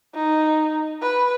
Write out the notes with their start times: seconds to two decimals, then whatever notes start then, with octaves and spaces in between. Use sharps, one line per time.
0.15 D#4
1.02 B4